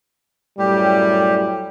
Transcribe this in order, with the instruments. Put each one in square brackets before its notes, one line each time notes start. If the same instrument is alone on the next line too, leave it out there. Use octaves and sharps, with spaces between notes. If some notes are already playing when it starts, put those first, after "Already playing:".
[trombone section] F#2 A2 G3 [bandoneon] G4